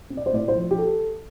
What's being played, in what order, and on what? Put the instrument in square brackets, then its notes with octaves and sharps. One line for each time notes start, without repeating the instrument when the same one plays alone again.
[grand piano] C4
D5
C5
A2 D5
C5
F3
G4
A4